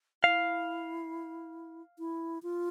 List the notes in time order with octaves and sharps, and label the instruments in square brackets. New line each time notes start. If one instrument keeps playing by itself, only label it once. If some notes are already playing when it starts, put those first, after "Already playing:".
[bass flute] E4 [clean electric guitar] F5
[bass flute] E4
F4